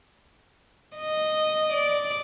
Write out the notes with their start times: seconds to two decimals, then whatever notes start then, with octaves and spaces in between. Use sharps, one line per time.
0.96 D#5
1.73 D5